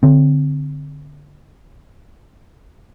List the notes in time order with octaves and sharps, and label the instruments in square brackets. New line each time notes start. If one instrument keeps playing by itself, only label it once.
[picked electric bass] D3 C4